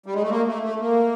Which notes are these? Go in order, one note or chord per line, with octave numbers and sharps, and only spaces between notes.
G3
G#3
A3
A#3
A3
A3
A#3